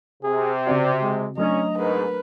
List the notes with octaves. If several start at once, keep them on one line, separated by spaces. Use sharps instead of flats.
C3 G#4
C#3 C4 F#4 D5
G#3
F#3 A3 C#4 D4 D#5 A#5
G#2 A#4 B4